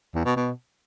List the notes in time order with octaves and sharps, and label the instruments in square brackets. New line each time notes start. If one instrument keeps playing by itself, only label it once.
[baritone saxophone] E2
B2
B2